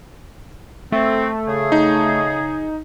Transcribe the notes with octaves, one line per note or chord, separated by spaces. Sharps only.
A3 C4
C#3 G#4
D#4